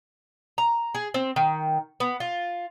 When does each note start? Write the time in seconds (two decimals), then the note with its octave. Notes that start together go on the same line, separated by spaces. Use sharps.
0.58 A#5
0.95 G#4
1.14 C4
1.36 D#3
2.00 B3
2.20 F4